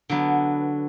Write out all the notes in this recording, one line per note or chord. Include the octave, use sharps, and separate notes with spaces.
D3 F#3 B3